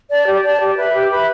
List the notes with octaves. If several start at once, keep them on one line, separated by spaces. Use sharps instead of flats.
D5 A5
G4
D5 A5
G4
B4 E5 B5
G4
B4 E5 B5